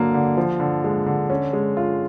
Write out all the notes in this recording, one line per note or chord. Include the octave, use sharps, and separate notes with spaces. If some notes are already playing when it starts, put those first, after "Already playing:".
Already playing: D3 F#3 A#3
D3
F3
D3
G#3
D3
C#4
G#3
F4